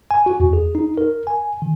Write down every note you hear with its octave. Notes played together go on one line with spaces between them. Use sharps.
G#5
F#4
E2
G#4
D#4
A#4
G#5
D#3